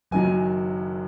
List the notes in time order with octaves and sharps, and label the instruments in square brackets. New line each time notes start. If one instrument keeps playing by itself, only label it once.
[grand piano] F#1 F#2 D#3 F#3 G#5